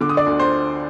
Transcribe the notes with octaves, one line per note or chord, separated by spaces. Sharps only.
D3 D6
D#6
D5 D6
D2
C5 C6